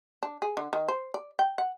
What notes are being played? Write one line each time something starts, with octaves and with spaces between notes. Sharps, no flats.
D4
G#4
D3
D#3
C5
D5
G5
F#5